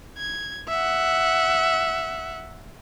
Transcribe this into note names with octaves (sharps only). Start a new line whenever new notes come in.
G#6
E5 F#5